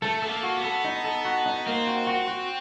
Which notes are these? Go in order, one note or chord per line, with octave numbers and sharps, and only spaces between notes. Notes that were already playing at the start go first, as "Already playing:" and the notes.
A3 A4
B3 A4
A#3
F#4
B3
A4
D#4
A4
F#4
D#4
A#3 C4
F#4
F#4
F#4